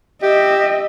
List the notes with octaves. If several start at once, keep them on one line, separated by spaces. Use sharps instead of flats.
G4 D#5 E5